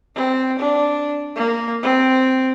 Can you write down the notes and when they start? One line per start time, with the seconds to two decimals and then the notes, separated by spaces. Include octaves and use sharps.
0.15 C4
0.59 D4
1.36 A#3
1.83 C4